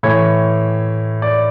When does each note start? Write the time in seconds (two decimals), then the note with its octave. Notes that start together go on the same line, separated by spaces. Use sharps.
0.03 A2 E3 C#5
1.22 D5